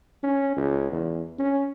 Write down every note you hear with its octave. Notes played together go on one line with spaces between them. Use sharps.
C#4
C#2
E2
C#4